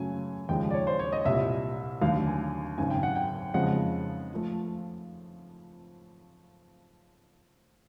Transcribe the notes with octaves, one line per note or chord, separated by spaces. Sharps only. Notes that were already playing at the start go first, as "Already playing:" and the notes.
Already playing: F#2 C#3 F#3 A3 G#5
D#2 C#3 F3 G#3 G5
D5
C#5
C5
C#5
D#5
C2 A#2 G3 E5
D#2 D3 F#3 A3 F5
G#5
G#1 F#2 C#3 G#5
G5
F#5
G5
F2 C#3 F3 G#3 F#5
F3 A3